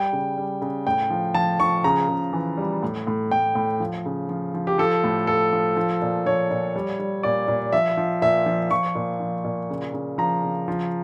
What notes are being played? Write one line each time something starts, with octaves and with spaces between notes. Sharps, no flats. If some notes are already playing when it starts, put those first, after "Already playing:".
Already playing: G3 G5
C#3
G3
C#3
A2 G5
F3
F3 A5
F3 C#6
C#3 A#5
C#3
E3
G3
A2
A2
A2 G5
A2
F3
C#3
F3
F3
G4
F3 A4
A2
F3 A4
F3
F3
A#2
F3 C#5
A#2
G3
G3
A#2 D5
A#2
F3 E5
F3
A#2 E5
F3
F3 C#6
A#2
F3
A#2
C#3
C#3
F3 A#5
C#3
F3